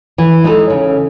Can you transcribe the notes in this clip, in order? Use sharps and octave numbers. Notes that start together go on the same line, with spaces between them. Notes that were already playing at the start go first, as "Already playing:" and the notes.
E3
G#3 D#4 A4
C#3